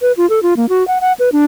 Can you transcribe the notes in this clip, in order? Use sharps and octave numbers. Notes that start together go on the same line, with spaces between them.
B4
F4
A4
F4
A#3
F#4
F#5
F#5
B4
D4